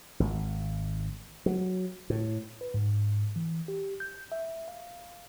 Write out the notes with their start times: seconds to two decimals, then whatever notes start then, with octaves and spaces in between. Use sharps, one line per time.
0.20 G#1
1.46 F#3
2.10 A2
2.61 B4
2.74 G#2
3.36 E3
3.68 G4
4.00 G6
4.32 E5
4.68 F5